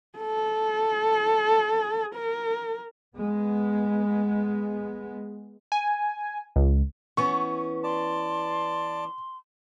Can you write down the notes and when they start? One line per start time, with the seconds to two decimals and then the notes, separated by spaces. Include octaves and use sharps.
0.18 A4
2.15 A#4
3.18 G#3 B3
5.72 G#5
6.56 C#2
7.17 E3 B3 C#4 C#6
7.84 D5 A5 C6